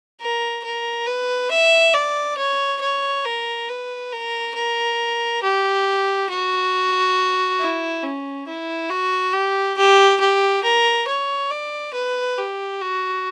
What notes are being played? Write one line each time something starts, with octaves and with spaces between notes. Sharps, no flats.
A#4
A#4
B4
E5
D5
C#5
C#5
A#4
B4
A#4
A#4
G4
F#4
E4
C#4
E4
F#4
G4
G4
G4
A#4
C#5
D5
B4
G4
F#4